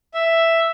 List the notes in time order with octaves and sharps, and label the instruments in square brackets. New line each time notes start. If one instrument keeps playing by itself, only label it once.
[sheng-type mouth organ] E5